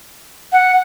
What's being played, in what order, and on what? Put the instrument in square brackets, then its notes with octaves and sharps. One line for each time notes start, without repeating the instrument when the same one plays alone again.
[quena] F#5